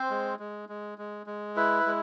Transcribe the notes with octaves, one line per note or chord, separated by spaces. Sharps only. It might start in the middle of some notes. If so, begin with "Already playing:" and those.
Already playing: C4 C5
G#3
G#3
G#3
G#3
G#3
E4 B4
G#3